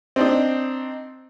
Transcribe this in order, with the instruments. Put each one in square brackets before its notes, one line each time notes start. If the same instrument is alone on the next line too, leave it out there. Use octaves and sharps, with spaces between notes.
[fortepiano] C4 D4 D#4